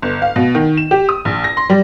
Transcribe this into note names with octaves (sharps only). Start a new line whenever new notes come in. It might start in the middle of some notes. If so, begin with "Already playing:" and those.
G1
F5
B2
D#3
E7
G4
D#6
A#1
A#6
C6
G3